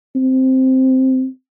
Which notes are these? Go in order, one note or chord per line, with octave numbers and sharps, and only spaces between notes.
C4